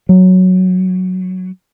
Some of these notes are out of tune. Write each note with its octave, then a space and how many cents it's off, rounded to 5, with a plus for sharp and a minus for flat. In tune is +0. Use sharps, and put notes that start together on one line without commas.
F#3 +0